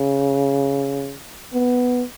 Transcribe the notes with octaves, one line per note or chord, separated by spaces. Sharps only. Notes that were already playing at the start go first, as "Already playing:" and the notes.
Already playing: C#3
B3